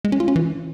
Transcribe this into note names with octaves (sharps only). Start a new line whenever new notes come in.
G#3
C#4
F4
C#4
E3